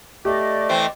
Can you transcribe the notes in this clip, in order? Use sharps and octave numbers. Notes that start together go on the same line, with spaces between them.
A3 G4 D5 D#5 D6
E3 C4